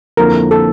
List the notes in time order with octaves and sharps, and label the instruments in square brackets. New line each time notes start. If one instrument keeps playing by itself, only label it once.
[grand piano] F2 D3 F3 A#3 E4 [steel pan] A#4
[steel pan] A4